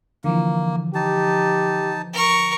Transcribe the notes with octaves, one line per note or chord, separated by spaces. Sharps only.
D3 E3 F3 A#3
D#4 G4 A5
A#4 C#6